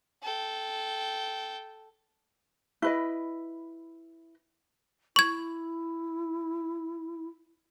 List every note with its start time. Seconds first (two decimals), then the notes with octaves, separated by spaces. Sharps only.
0.23 A4 G5
2.82 E4 B4 D#5
5.16 E4 C#6 G#6